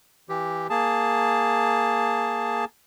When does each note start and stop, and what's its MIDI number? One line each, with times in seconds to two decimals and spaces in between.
0.29 0.67 52
0.29 0.67 67
0.70 2.65 58
0.70 2.65 68
0.70 2.65 81